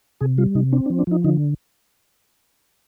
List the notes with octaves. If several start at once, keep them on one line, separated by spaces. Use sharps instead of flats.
C3 G#4
G3 F4
C3 D#4
C4 D4
D4
F3
D4
F3 D#4
D3 D#4